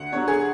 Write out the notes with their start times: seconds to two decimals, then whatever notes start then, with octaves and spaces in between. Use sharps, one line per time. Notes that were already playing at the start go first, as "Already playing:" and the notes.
Already playing: D2 F#5
0.12 D3 F#3 C#5
0.28 G#4